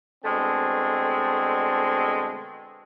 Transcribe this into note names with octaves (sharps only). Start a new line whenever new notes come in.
B2 D3 G#3 A3 C4